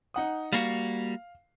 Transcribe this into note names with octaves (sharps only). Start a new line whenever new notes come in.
D#4 F#5 D#6
G3 A#3 F#4 F5